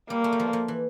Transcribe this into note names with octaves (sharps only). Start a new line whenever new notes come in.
G3 A#3
A3
G3
F3
F3
E3